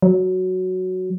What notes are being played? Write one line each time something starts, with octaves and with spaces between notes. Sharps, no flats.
F#3